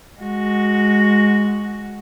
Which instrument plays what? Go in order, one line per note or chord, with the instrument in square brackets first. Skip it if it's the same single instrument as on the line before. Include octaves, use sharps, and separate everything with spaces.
[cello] G#3 F#4